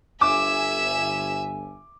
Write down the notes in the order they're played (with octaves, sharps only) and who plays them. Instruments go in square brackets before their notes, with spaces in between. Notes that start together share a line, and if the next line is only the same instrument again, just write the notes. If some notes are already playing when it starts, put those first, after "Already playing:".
[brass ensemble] G1 G#5 [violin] E5 E7 [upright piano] D6